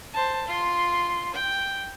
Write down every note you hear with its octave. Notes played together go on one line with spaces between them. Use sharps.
C5 A5
F4 C6
G5